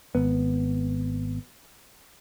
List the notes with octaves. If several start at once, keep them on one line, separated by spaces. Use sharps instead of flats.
G#1 B3